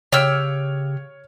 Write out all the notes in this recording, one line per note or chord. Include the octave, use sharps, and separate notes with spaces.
C#3 G4 C#5 F5 E6 F6 D7